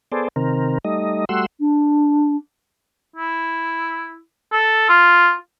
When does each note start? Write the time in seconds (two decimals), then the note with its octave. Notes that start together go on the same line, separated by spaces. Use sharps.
0.12 B3 G#4 A4 C5 D5
0.36 C3 D#3 C4 A#4
0.85 G3 A3 D#4 D#5
1.29 G3 A3 F#4 F#5 C6 E6
1.60 D4
3.16 E4
4.52 A4
4.89 F4